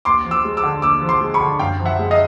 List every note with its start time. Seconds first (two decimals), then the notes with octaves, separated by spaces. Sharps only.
0.05 D#2 C6 D6
0.25 F3
0.31 D6 E6
0.45 G#3
0.57 D6 E6
0.63 D3
0.82 D#2 D6 E6
1.02 F3
1.09 C6 D6
1.21 G#3
1.34 B5 C#6
1.41 D3
1.59 F#2 F5 G5
1.79 F3
1.85 E5 F#5
1.99 G#3
2.11 D#5 F5